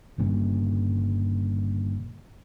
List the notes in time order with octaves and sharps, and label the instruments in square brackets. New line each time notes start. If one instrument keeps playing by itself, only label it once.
[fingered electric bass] G1 G2 A#2 C#3